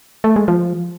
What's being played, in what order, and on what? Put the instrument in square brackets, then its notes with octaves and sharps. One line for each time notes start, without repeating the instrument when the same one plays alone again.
[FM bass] A3
G#3
F3